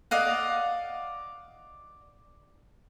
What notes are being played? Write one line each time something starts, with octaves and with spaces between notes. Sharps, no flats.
D5 D#5 F5 F#5